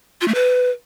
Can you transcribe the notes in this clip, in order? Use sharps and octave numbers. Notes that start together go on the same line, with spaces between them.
F4
A3
B4